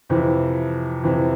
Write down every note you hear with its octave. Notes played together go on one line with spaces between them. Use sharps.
F2 C3 E3
F2 C3 E3